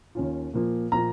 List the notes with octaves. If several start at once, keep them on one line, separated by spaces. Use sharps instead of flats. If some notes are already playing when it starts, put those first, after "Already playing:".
D#2 D#3 C#4 F4
A#2 F3 A#3 F4
A#2 F3 A#3 F4 A#5